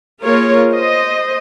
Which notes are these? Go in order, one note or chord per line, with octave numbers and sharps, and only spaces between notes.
A#3 F4 G#4 A#4 C#5
C5 D#5